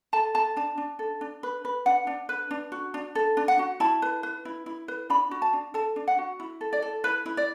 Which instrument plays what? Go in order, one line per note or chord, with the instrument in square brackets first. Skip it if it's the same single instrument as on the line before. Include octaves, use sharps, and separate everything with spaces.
[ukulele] A4 A5
A4 A5
D4 A5
D4
A4
D4
B4
B4
D4 F#5
D4
B4
D4
F#4
D4
A4
D4
F#5
F#4
E4 A5
B4
B4
E4
E4
B4
D4 B5
F#4
A5
D4
A4 A5
D4
F#5
F#4
E4
A4
D5
A4
E4 B4
E4
D5